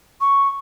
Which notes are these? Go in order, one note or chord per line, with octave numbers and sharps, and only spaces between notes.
C#6